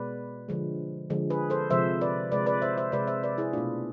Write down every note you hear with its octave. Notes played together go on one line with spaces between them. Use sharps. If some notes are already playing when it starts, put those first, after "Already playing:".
Already playing: B2 G#3 B4 D5
D3 F3 G#3
D3 F3 G#3
G#4 B4
A4 C5
C3 F3 G#3 C5 E5
B4 D5
C3 G#3 B4 D5
B4 D5
C5 E5
C5 E5
C3 G#3 B4 D5
C5 E5
B4 D5
E4 G#4
B2 A3 D4 F4